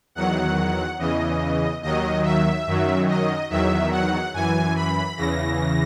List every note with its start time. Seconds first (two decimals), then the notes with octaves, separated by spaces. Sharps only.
0.15 E2 D#3 F#3 F#5
0.99 E2 C#3 E3 D#5
1.82 D#2 D#3 F#3 D#5
2.24 E5
2.66 F#2 D#3 F#3
3.08 D#5
3.50 E2 D#3 F#3 E5
3.91 F#5
4.34 F#2 E3 G#5
4.76 B5
5.17 E2 C#3 E3 A#6